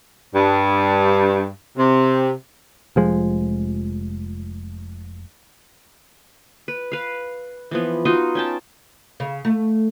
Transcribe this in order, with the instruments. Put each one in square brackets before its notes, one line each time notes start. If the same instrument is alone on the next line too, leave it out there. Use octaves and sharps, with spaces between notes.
[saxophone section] G2
C3
[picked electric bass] F1 F3 G#3
[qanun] B4
B4 F5
E3 F3 B3
D#4 F4 F#4 D#5
C#4 G5 A5
[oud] C#3
A3